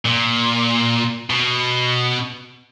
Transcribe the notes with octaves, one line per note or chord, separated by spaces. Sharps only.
A#2
B2